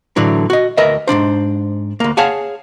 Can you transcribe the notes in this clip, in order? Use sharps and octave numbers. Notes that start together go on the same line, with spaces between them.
A2 D3 E3 F#3 D4
F#4 D#5
D2 A#4 B4 D#5 E5
G#2 B2 D4 C5
D2 A#3
G#4 C#5 F5 F#5 G#5 A5